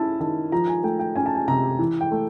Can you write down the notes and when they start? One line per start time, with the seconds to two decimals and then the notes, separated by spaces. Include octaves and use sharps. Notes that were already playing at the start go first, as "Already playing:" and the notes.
Already playing: C#4 E4 A5
0.20 D#3 A5
0.52 F3 A#5
0.68 G#5
0.84 A3 G5
0.99 G5
1.16 C#4 G#5
1.26 A5
1.35 G#5
1.48 C3 A#5
1.79 E3
2.01 G5
2.12 A3